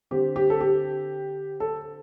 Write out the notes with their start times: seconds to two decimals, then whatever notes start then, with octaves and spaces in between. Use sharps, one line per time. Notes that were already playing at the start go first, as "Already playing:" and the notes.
0.11 D3 C4 G4
0.36 G4
0.50 A4
0.61 G4
1.60 A4